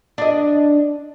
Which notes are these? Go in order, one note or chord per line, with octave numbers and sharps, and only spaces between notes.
D4 D#5